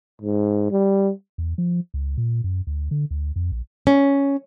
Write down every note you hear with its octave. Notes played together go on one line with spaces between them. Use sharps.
G#2
G3
E2
F3
C#2
A#2
F#2
D2
D3
D2
F2
A#1
C#4